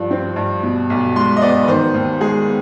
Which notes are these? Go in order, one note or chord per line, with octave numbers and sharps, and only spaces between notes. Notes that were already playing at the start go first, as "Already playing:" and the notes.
Already playing: G2 F3
C4
G2
B2
B1
G#3 C6
D#5
B3 D5
B4
D#3 C5
D#2
G#3 G#4
B3